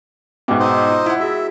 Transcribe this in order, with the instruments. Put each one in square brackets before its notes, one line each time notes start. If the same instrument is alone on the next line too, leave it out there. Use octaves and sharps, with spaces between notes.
[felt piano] G#2 B2 [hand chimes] E5 G5 D6
[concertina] D#4 C5 D#5 [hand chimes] F#5 E6
[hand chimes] F4
[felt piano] E4 F#5
[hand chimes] F#4 G#4 [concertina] E5